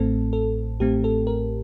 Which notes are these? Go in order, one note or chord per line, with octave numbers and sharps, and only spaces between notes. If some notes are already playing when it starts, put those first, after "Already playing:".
Already playing: A1 A2 A3 C4 A4
A4
A1 A2 A3 C4 G4
A4
A#4